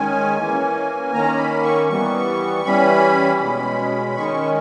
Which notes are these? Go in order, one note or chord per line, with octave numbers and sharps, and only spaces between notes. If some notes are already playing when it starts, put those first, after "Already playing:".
Already playing: D#3 G#3 C#4 G#5
E3 A#3 C#4
D#3 A#3 C#4 A#5
B5
C#6
E3 G3 B3 C#6
E3 G3 C#4 B5
B2 G#3 C#4
D#3 G#3 C#4 C#6